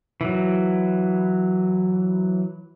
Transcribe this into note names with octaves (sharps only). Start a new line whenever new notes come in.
E3 F#3